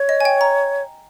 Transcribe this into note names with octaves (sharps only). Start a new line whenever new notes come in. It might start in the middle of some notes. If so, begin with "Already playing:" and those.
Already playing: C#5
D#5
G#5
G5
A#5